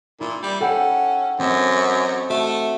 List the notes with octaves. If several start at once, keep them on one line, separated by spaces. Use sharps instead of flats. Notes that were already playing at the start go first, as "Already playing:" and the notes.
A#2 E4
G3
C#4 A4 F#5 G5
F#2 C4 D#5 E7
A3 F#4 E5